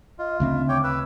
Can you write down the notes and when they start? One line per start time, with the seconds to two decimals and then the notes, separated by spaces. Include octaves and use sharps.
0.19 F4 D#5
0.40 D2 C#3 C4 E5
0.69 C#5 G5 D6
0.83 B4 E6